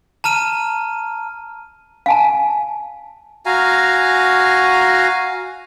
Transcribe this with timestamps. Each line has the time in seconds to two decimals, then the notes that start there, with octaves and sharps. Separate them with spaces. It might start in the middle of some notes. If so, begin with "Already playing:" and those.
0.24 A5 A#5 F6 D#7
2.06 F5 G#5 A5
3.46 F#4 F5 G#5 A#5